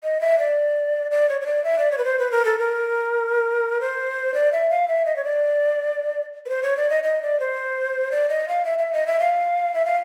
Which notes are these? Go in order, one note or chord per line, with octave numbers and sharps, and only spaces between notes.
D#5
E5
D5
D5
C#5
C#5
D5
E5
D5
C#5
B4
C5
B4
A#4
A4
A#4
C5
D5
E5
F5
E5
D#5
C#5
D5
B4
C5
C#5
D5
D#5
D#5
D5
C5
D5
D#5
F5
E5
E5
D#5
E5
F5
E5
F5